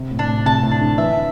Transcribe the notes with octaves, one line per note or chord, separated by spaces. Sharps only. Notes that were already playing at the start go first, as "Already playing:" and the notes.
Already playing: C3
A2
C3 D4
A2
C3 A5
A2
D4
D3
E3 E5